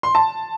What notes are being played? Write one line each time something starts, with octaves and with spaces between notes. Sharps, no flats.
C6
A5